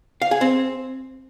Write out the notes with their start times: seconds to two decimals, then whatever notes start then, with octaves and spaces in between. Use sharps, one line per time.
0.22 F5
0.31 G#4
0.41 C4